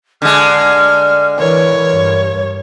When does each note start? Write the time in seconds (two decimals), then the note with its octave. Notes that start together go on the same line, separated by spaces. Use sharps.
0.22 D3 G#3 F6
1.39 E3 A#4 C#5
1.91 G2